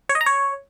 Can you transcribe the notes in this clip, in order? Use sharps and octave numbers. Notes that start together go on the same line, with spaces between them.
C#5
D#5
A#5
C#5